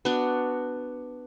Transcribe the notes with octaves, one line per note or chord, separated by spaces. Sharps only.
B3 D4 F#4